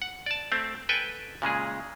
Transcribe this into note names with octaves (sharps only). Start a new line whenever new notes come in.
F#5
D5 A5
A3 C4
A4 B4 G5 G#5
A#2 C#3 G#3 G#4